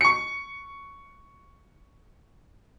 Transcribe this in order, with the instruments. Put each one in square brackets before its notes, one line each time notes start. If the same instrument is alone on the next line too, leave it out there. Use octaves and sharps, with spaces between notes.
[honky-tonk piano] C#6 C#7